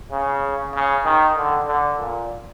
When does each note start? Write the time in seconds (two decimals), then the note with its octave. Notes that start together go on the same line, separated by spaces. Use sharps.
0.12 C#3
0.74 C#3
1.05 D#3
1.37 D3
1.68 D3
2.00 A#2